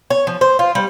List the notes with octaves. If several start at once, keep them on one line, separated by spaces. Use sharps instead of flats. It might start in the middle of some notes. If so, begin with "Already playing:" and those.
C#5
F3
C5
F4
G3